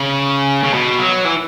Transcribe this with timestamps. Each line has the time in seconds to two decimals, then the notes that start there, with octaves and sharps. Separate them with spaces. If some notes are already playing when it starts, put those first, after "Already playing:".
Already playing: C#3
0.63 C#3
0.73 B2
0.99 F#3
1.25 E3